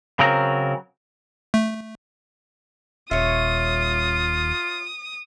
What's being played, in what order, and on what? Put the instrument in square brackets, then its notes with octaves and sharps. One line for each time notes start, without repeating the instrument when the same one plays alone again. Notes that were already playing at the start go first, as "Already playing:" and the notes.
[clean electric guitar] C#3 F#3 C4 A#4
[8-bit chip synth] A3
[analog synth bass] D#1 [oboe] F4 [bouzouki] C#5 E5 [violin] D#6